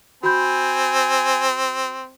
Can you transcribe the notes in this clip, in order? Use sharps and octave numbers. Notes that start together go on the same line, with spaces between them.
C4 F#4 G#5 B5 G6